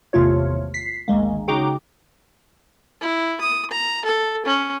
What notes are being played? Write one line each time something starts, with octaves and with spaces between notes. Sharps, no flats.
G#1 E2 C3 A3 F4 C#5
B6 C7
G#1 D2 G#3 A#3
C#3 D#4 F#4 G5 A#5 D6
E4
D#6
A#5
A4
C#4